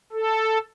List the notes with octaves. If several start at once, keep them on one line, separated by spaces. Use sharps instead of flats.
A4